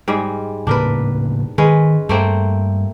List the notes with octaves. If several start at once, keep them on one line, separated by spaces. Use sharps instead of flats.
G#2 G3 G#3
A2 C#3 A#3 D4 A#4 B4
D#3 G#3 C#4 B4
G2 A3 A#3 C4